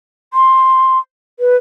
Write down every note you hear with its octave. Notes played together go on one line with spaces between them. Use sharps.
C6
B4